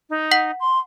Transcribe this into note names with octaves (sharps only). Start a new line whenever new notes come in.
D#4
F#5 B6 F#7
C6